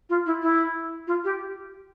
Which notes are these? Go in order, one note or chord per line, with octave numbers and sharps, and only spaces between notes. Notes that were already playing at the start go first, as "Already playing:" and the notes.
F4
E4
E4
F4
G4